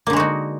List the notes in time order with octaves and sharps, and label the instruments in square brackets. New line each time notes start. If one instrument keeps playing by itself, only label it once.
[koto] A#3
D3
G#3
F#4
D#4